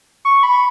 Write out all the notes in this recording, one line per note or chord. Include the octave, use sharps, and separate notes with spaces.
C#6
B5